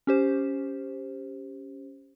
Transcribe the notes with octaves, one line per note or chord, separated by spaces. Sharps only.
C#4 G4 C5